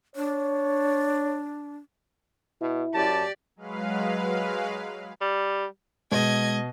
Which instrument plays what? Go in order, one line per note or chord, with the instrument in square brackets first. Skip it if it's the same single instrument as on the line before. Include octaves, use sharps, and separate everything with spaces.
[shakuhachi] D4 [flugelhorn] C#5
[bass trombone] B2 [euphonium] E4
[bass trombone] F#2 [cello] G4 D5 [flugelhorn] A5
[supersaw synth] F#3 G#3 B4 F5
[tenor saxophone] G3
[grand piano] B2 [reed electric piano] G#3 [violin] D#5 G#6